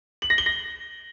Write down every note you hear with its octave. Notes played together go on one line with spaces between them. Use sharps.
F#7
A#6
G7
A#6